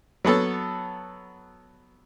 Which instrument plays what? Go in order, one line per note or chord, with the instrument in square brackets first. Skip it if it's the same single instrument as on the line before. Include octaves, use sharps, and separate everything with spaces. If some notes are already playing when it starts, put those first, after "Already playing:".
[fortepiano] F#3 B3 A4 A5